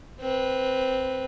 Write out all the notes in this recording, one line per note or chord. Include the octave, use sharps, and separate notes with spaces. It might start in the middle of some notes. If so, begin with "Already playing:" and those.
C4 B4